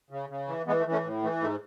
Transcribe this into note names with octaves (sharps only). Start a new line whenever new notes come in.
C#3
C#3
E3
E3 G#3 B3
A3
E3
A3 C#4
A2
E3 A3
G#2 A3